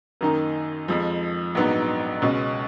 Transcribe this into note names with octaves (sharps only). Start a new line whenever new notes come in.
F#2 D#3 A#3 D#4
F2 F3 G#3
A#1 G#2 F#3 B3 D#4
C#2 B2 G#3 C#4